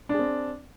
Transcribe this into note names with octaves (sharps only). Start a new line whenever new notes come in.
C4 D4 G#4